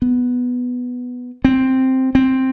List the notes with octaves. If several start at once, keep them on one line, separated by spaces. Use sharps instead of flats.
B3
C4
C4